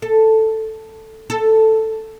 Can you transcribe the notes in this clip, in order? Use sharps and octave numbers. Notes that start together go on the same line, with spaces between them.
A4
A4